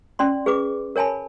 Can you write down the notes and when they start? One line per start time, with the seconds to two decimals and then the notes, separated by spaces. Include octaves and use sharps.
0.19 C#4 D5 C6
0.46 G#4 B4 D6
0.96 A#4 C#5 G#5 A5 B5